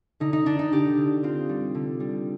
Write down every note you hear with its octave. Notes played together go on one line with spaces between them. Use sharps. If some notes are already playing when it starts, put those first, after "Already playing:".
D3 D#4
D#4
D3 D4
D#4
D3 G4
D3
C4 F4
G3
D3
G3